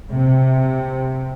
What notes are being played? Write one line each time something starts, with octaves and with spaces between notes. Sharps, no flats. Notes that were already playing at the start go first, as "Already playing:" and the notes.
C3